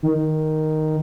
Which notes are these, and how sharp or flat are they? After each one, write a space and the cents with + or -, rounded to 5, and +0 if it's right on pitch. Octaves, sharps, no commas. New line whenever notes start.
D#3 +0